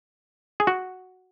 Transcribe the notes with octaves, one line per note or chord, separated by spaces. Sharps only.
G#4
F#4